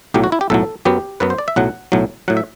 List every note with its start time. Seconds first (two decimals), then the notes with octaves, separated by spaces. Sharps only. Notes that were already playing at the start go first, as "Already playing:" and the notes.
0.14 B1 A2 F#3 G4
0.24 F#4
0.32 E4
0.41 G4
0.50 B1 A2 F#3 A4
0.85 F#2 F#3 B3 G4
1.20 F#2 F#3 B3 B4
1.30 C5
1.38 D5
1.48 E5
1.56 B1 A2 F#3 F#5
1.92 B1 A2 F#3
2.28 A2 F#3 F#5
2.37 E5